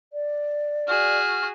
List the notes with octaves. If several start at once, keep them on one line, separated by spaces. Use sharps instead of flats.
D5
F#4 G#4 F6